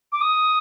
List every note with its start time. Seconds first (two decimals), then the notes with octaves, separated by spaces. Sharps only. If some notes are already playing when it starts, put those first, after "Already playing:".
0.12 D6
0.21 D#6